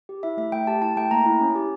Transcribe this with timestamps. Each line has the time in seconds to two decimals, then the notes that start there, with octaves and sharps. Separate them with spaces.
0.09 G4
0.23 E4 E5
0.37 A3 E5
0.52 A3 G5
0.67 G4 A5
0.82 E4 A5
0.96 A3 G5
1.11 A#3 A#5
1.26 E4
1.41 C#4
1.55 G4